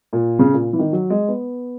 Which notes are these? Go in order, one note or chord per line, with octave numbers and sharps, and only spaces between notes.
A#2
C#3
A#2
E3
D#3
F#3
G#3
B3